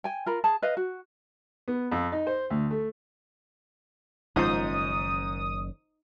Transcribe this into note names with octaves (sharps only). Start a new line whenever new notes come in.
G5 G#5
F4 A#4 B5
G#4 A5
B4 D#5 F5
F#4
B3
F2
D#4
C5
D2
A3
F#1 G#2 D#3 F3 C#4 D#4 C5 D#6